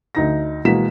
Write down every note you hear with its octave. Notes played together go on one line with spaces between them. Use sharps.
D2 D#4 A#6
B2 E3 G#3 A#3 B6 E7